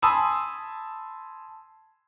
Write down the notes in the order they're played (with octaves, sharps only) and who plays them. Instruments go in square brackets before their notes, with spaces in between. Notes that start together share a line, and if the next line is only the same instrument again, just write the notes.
[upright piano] G#5 A5 B5 C6 D#6 E6